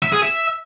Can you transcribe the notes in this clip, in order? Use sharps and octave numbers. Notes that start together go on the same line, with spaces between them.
E5
G#4
E5